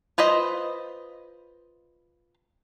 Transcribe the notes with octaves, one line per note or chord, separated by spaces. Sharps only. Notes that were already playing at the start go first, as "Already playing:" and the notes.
F4 B4 C5 D#5